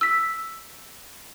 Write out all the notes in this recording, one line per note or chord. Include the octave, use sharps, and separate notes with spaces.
E6 B6